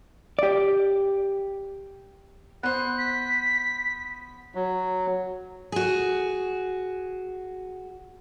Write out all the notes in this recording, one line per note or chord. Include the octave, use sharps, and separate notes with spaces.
G4 D5
B3 C5 F#6
B6
F#3
F#4 G#4